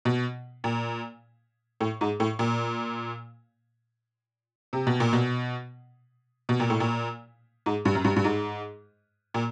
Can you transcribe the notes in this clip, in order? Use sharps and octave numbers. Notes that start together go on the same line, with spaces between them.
B2
A#2
A2
G#2
A2
A#2
C3
B2
A#2
B2
B2
A#2
A2
A#2
G#2
G2
F#2
G2
G2
G#2
A#2